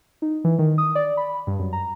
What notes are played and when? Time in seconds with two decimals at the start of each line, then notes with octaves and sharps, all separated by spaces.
0.22 D#4
0.44 E3
0.59 D#3
0.78 D#6
0.95 D5
1.17 B5
1.47 G2
1.59 F#2
1.73 A#5